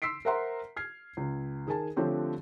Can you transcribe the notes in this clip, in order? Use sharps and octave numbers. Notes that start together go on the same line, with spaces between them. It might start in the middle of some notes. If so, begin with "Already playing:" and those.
C6 E6 B6 C7 D7
A#4 C5 E5 F#5 A#5 C6
F6 G#6 C7
C#2
D#3 G#4 A#4 G#5 A5
D3 F3 A3 C4 G4 C#5